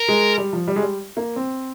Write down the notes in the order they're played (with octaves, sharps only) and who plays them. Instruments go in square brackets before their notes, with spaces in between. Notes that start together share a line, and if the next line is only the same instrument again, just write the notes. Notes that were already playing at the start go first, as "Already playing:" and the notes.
Already playing: [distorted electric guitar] A#4
[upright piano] G#3
G3
F3
G3
G#3
G3
A#3
C4